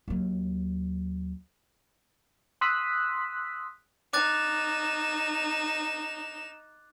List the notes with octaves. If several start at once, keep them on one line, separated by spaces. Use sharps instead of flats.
D#2 F#3
C6 D#6 E6 F#6 B6
D#4 D6 F#6 A6 E7